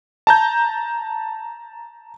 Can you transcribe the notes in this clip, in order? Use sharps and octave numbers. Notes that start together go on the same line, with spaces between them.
A5 A#5 G6